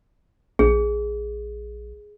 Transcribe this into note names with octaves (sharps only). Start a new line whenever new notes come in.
A#1 G#4